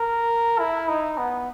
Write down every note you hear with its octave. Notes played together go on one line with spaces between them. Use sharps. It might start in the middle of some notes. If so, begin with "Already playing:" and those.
Already playing: A#4
E4
D#4
B3